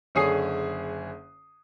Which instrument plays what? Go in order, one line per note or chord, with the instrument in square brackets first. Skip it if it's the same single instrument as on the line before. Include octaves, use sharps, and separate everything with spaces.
[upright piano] F#1 D3 G#4 C#5 D#6 C7